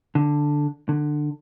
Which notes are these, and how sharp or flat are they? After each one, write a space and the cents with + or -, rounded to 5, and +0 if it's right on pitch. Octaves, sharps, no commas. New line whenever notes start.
D3 +0
D3 +20